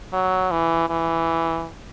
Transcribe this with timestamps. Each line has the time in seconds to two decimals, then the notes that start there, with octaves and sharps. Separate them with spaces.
0.13 F#3
0.51 E3
0.90 E3